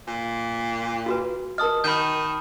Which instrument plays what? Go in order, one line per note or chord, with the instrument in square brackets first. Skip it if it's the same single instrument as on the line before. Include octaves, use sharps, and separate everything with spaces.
[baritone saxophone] A#2
[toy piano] F4 F#4 B4
[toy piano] A#4 D#5 [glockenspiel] A5 D#6 F6
[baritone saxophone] D#3 [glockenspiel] B5 F6 G6